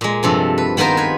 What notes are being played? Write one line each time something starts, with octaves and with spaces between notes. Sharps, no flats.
A#2 G#3
G2 C3 F3 A4
B4
D#3 B3 F4 A#4 C5
B4 G#5